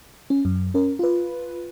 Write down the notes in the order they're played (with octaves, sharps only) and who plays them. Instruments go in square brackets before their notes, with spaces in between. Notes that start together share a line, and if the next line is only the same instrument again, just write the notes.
[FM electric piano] C#4
F#2
C#4 A#4
F4 B4